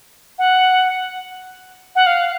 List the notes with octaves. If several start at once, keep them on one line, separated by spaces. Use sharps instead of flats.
F#5
F#5
F5